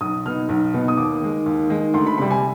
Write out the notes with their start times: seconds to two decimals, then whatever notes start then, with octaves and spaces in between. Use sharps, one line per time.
0.01 B1 D#6
0.26 B2 B3 D#4 F6
0.49 B1
0.74 B2 B3 D#4
0.88 D#6
0.97 D#2 D6
1.21 D#3 G#3
1.46 D#2
1.69 D#3 G#3
1.94 D2 C6
2.06 B5
2.18 C3 G3 B5
2.31 G#5